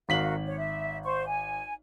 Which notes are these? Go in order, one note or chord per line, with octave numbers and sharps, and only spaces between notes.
G#1 F#4 A#4 F5 B6 F#7
C#5
E5
C5 C#6
G#5